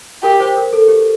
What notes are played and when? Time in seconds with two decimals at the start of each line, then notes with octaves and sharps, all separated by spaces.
0.23 G4 A#4
0.40 C5
0.57 A#4
0.73 A4
0.88 G4